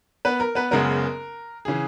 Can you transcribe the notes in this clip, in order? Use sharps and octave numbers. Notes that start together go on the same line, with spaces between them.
B3 B4
A#4
B3 B4
F#1 F#2 C#3 G#3 B3 A#4
C#3 E3 G#4